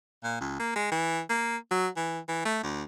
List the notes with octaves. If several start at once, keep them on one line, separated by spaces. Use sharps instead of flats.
A#2
C#2
A#3
G#3
E3
A#3
F#3
E3
E3
A3
D2